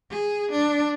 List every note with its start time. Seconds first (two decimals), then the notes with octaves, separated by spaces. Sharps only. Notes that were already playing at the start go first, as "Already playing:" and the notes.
0.10 G#4
0.51 D4